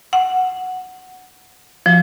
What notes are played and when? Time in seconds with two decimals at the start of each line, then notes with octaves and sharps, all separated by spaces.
0.13 F#5
1.86 F3